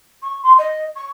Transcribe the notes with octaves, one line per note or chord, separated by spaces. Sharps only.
C#6
C6
D#5
C#6